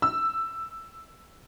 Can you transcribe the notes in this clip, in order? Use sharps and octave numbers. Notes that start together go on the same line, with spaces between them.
E6